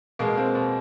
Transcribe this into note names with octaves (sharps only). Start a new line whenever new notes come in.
B2 G#3 A#3
A#3 C4
B2